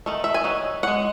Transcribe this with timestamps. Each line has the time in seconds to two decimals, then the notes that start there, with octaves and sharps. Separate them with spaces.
0.06 D#3 A3
0.24 E5
0.34 G#5
0.44 D#3 F#3
0.83 G#3 C#4 F#5